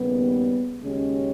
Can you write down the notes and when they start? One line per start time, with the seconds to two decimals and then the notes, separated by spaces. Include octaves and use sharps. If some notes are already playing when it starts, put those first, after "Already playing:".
Already playing: D#2 C#3 G3 B3
0.80 D#2 C#3 G#3 C#4 G4